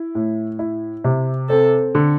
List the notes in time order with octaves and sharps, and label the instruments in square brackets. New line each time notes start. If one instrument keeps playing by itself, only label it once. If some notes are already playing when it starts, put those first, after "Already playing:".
Already playing: [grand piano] E4
A2
E4
C3
[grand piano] C4 [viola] A4
[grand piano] D3